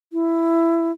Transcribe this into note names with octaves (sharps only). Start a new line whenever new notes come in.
E4